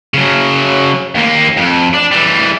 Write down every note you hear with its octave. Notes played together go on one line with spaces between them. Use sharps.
C#3 F#3
D#2 A#3
F2
D4
E3 G3